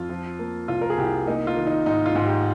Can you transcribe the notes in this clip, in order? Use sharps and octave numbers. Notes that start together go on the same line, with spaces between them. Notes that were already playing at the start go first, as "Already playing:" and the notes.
Already playing: F2 F4
F3
A#3
C2 F4
A#4
G#4
C2 G4
A#3 D#4
F4
D#3
D#4
G#2 D#4
F4
G#2
G4